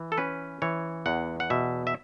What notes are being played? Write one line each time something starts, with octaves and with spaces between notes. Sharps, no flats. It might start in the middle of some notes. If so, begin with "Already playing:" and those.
Already playing: E3
A4
C#4 B4
E3 C#5
E2 F#5
F#5
B2 E5
E5